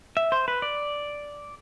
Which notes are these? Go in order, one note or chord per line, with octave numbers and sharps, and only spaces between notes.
E5
C5
B4
D5